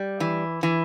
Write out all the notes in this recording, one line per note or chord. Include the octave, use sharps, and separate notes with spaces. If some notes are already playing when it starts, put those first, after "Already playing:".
Already playing: G3
E3
E3